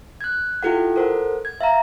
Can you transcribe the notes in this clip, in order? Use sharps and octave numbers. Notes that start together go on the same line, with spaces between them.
F#6 G#6
E4 F4 G4 A4 F#5
A4 A#4 C5 F#5
G#6
E5 F5 A#5